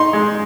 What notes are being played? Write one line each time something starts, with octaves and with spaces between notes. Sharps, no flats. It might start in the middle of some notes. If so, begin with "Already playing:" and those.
Already playing: D#4 C6
G#3